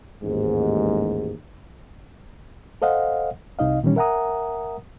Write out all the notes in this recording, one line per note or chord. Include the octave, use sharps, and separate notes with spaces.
A1 D#2 G#2
A4 C5 D#5 F5 F#5
C2 C3 D#4 D#5 F5
A#2 D#3 E3 G3 C#4
A#4 E5 F#5 G#5 A#5 D#6